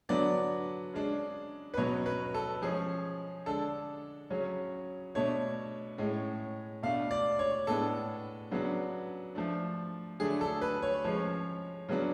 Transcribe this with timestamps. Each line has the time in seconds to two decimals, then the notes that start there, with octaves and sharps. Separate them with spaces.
0.09 D3 F#3 B3 D4 D5
0.93 C#3 G#3 D4
1.74 B4
1.77 B2 F#3 C#4 C#5
2.06 B4
2.34 A4
2.62 F3 G#3 C#4 G#4
3.46 D3 G#3 D4 A4
4.30 C#3 F#3 C#4
5.15 B2 A3 D4 C#5
5.98 A2 G#3 C#4
6.83 B2 A3 D4 F5
7.11 D5
7.39 C#5
7.67 A2 G#3 B3 D4 A4
8.51 C#3 F#3 B3 D4
9.35 F3 A3 D4
10.20 D3 F#3 A3 D4 G#4
10.41 A4
10.62 B4
10.82 C#5
11.04 F3 G#3 C#4 C#5
11.88 C#3 F#3 B3 D4